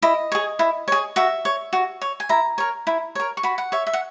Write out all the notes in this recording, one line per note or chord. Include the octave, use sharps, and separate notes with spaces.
E4 D#5
G#4 C#5
E4
G#4 C#5
F#4 E5
C#5
F#4
C#5
G#5
E4 A#5
A#4 C#5
E4
A#4 C#5
C#6
F#4 B5
F#5
C#5 E5
E5
F#5